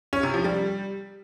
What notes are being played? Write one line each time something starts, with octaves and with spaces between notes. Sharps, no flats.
C#4
C3
F3
G3